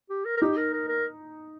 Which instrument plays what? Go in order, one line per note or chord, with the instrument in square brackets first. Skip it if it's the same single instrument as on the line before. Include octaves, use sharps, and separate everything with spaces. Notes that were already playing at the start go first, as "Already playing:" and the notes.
[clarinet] G4
A#4
A#4
[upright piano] D#4 [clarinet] G4
[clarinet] A#4
A#4
A#4